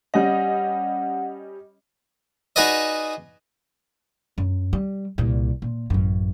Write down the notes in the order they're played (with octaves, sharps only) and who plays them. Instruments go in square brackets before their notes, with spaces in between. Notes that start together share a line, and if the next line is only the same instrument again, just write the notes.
[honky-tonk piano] G3 C#4 D#5 [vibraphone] F#5
[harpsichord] D#4 F#4 G#4 B4 D5 D#5
[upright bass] F#2
G3
C2 A#2
A#2
A1 F#2